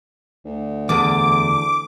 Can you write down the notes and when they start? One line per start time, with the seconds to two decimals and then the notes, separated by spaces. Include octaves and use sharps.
0.45 D2
0.89 E2 D3 D6